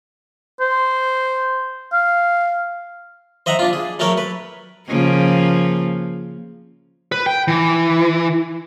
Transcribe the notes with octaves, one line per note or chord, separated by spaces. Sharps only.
C5
F5
C5 D#5 E5 F#5 A#5
D4 F4
G#4
F#3 A3 A#4 C#5 G5
B4
C#3 F3 A#3
B4
G5
E3